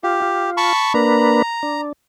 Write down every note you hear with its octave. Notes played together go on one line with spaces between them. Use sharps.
F4 G4
F4
A5 B5 C#6
A#3 D4 B4 A#5
D4